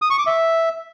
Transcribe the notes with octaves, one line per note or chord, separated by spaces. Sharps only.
D#6
C#6
D6
E5